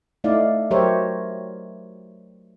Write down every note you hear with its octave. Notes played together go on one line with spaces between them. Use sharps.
A3 D#4 E4 D5 F5
F#3 G4 A#4 C5 C#5 E5